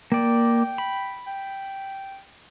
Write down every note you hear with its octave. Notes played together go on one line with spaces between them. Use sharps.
A#3 D5 G5
B5
G5